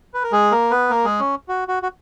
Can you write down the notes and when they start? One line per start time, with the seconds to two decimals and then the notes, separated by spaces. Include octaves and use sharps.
0.14 B4
0.23 A#4
0.32 G#3 G#4
0.52 A#3 A#4
0.71 B3 B4
0.90 A#3 A#4
1.05 G#3 G#4
1.20 C#4
1.49 F#4
1.68 F#4
1.83 F#4